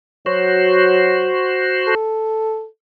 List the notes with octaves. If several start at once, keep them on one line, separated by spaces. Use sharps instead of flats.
F#3 F#4 C5
A4